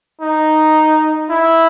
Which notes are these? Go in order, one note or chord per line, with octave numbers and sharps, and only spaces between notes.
D#4
E4